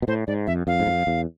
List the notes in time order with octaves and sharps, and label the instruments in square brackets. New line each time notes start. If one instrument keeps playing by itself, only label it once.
[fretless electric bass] B2
[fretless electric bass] A2 [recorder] C5
[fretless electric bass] G#2 [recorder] D5
[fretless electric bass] F2 [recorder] E5
[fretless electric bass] F2 [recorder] F5
[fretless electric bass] G#2
F2
E2